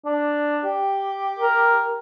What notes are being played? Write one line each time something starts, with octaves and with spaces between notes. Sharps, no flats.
D4
G4
A#4